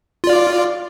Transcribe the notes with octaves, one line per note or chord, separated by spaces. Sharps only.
F4 D5